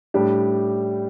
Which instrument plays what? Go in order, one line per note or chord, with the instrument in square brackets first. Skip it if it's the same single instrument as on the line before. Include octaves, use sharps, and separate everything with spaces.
[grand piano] A2 G3 D4 G4